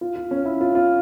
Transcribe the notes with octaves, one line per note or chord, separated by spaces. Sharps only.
F4
F4
C#4
E4
F4
F4